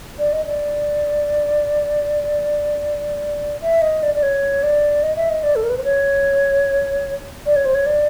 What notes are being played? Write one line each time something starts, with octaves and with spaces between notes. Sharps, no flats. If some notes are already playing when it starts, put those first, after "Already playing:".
D5
D#5
D5
E5
D#5
D5
D5
C#5
D5
D#5
E5
D#5
D5
A4
A#4
B4
C5
C#5
D5
C#5
C5
C#5
D5